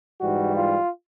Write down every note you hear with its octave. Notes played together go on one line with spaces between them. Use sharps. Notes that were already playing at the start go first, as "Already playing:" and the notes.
G#2 E3 G3 F#4
F4